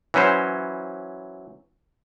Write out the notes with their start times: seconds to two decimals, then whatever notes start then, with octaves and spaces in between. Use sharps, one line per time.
0.14 E3 F#3 C#4 B4 C5